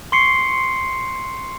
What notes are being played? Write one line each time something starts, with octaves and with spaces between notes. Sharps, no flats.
C6 C#6 C7 C#7